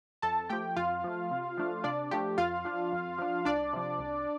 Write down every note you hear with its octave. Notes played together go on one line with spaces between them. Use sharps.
F2 A4 A5
F3 A3 G4 G5
F2 F4 F5
F3 A3
C3
F3 A3 D4
C3 D4 D5
F3 A3 D4 G4
F2 F4 F5
F3 D4
F2
F3 D4
C2 D4 D5
C3 F3
C2